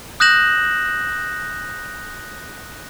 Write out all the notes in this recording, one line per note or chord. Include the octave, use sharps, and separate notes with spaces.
D#6 F#6 G6 A#6 E7 F#7